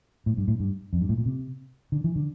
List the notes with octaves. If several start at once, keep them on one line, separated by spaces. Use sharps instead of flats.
A2
G2
A2
G2
F2
G2
A2
A#2
C3
D3
E3
D3